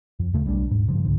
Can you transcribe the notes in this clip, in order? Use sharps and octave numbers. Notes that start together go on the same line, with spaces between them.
F2
D#2 C#3 A3
B1 G3 C4 D4
D#1 G#2
G2 C#3 F3
C#2 G#2 D3